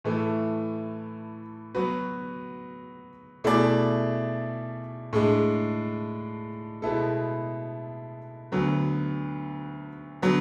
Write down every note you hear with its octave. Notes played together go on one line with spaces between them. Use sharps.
A2 E3 A3
F#3 B3 F#4 B4
B2 A3 E4 G#4 D5
A2 G#3 D4
B2 G#3 B3 E4 A4
D2 D3 F#3 B3
D3 F#3 B3